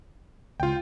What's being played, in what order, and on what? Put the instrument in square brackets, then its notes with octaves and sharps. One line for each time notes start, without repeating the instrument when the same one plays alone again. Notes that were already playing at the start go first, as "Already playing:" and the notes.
[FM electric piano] C#2 [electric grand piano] F4 G5